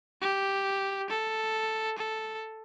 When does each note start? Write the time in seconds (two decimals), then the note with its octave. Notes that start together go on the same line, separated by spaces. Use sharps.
0.21 G4
1.10 A4
1.98 A4